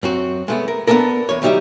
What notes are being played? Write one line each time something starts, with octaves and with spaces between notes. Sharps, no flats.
F#2 C4 F#4
G#3 A3 B3
A#4
B3 C#4 D4 A4 A#4
E2 C#5
D2 F#3 G3 D#4 G4 E5